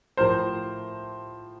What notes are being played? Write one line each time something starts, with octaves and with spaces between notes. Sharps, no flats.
A2 F3 A#4 C5